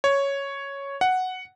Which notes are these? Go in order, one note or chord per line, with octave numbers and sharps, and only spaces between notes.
C#5
F#5